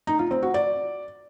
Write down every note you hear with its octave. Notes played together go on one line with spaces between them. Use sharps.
D#4
F4
C4
F#4
D5